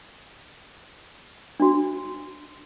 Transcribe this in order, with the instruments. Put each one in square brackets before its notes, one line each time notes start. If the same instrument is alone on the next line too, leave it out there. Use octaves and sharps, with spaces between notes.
[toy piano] D4 F#4